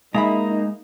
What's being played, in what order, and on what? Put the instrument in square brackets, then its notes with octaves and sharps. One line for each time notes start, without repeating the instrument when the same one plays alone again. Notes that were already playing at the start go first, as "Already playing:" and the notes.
[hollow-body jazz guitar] G#3 E5 B5 [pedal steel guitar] A#3 A#5 [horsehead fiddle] D#4